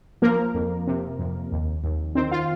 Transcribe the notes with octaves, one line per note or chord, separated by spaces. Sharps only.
F3 A#3 A#4
F2
C3
F2
D#2
D#2
D#3 C4 C5
F4 F5